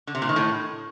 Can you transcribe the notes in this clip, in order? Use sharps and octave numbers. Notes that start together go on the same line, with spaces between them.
D3
C3
A#2
D#3
A2